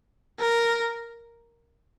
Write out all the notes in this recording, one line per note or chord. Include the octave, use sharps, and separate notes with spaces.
A#4